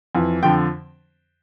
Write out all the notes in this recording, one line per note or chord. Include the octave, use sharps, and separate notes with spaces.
F2 E3
F2 D3 F3 G5